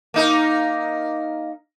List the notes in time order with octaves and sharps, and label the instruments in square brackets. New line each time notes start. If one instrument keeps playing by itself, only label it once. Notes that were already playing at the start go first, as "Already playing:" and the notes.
[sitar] A#3 D#4 A#4